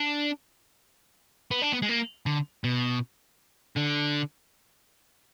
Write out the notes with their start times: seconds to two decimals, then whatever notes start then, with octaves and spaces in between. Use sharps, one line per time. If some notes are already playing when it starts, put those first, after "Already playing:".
Already playing: D4
1.51 B3
1.62 D4
1.72 B3
1.82 G#3
1.89 A#3
2.26 D3
2.64 B2
3.77 D3